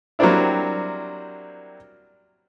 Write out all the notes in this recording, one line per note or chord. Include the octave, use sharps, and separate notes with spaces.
F#3 G3 A#3 C4 D4 E4